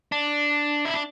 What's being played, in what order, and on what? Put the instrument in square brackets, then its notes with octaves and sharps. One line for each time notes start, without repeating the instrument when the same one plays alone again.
[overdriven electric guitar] D4
E4
D4